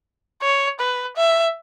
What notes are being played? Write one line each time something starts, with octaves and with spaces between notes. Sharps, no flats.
C#5
B4
E5